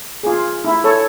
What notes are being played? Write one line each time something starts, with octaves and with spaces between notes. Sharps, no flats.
F4 G#4
E4
A4 C#5